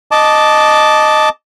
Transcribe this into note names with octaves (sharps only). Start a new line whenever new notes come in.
D#5 A5 D6